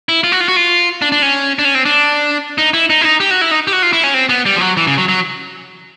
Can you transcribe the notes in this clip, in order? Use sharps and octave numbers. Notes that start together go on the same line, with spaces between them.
E4
F4
F#4
F4
F#4
F4
D4
D4
C#4
D4
C#4
C4
D4
D#4
E4
D#4
E4
D#4
G4
F#4
E4
D#4
G4
F#4
F4
E4
C#4
C4
B3
G3
F3
F#3
E3
C#3
F#3
F#3